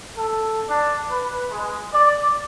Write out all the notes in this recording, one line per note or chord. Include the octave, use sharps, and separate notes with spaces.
A4
D4
B4
G#3
D5